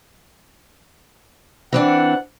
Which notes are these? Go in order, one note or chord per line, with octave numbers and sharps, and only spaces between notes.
E3 C4 D4 F#5